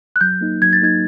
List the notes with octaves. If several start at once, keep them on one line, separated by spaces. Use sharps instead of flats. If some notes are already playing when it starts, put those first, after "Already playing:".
F#6
F#3 G6
A#3 D#4
F#3 G#6
A6
A#3 D#4 G#6